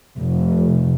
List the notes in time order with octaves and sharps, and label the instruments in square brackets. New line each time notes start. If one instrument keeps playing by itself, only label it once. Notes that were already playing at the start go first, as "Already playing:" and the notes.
[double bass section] F1